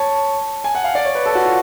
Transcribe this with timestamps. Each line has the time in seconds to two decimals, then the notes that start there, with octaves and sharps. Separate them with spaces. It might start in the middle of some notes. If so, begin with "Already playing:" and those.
Already playing: C#5 A5
0.64 G#5
0.75 F#5
0.84 F5
0.95 D5
1.05 C#5
1.15 B4
1.25 A4
1.35 F#4
1.45 F4